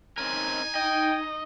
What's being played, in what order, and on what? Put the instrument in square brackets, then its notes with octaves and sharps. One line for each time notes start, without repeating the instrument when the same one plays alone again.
[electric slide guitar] C4 C#4 A#4 [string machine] D#4 [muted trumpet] G#5
[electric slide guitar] D#5 [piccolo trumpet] G5